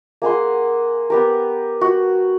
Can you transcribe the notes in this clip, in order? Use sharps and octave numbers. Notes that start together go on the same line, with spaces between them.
A#3 G#4 F#5 C6
B3 G4 A#4
F#4